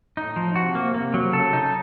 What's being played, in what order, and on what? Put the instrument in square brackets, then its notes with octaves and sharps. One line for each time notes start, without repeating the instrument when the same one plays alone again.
[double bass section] A2 [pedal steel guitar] D#4
[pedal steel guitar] F3
[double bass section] C3 [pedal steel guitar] F#4
[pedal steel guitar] A#3
A#3
F#3
[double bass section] C#3 [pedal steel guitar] A4
[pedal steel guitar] D#4